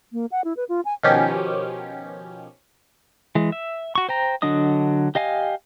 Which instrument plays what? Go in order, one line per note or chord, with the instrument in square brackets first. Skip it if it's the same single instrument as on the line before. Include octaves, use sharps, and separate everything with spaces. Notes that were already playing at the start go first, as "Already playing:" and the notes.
[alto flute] A#3
F#5
E4
B4
F4
G#5
[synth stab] B2 D#3 F3 C#4 G4
[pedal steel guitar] E3 G#3
E5
F#4 C#6
C5 G5 A#5
D3 F#3 D4 D#5 D#6
G4 D#5 F5 G#5